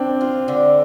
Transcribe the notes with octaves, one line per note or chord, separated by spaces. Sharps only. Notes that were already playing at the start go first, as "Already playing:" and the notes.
Already playing: C4 D4
F4
D3